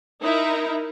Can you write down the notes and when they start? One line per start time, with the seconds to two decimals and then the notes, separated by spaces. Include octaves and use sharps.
0.21 D#4 E4 A#4